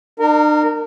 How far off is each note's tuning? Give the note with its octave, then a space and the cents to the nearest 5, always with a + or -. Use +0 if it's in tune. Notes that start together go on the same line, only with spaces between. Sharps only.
D4 +45 A#4 -20